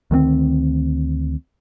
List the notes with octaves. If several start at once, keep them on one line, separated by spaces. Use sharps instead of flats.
D2 D#3 A3 C4